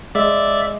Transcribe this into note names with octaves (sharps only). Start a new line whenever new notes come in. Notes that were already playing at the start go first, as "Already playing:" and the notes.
G#3 D5 E5